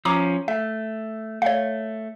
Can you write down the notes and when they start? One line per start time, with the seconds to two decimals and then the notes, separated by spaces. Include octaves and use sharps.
0.05 F3 C#4 A#5 D6 D#6
0.48 A3 E5
1.42 A3 C#5 F5